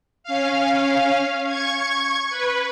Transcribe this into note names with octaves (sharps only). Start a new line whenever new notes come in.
C#4 F5
C#6 G#6
B4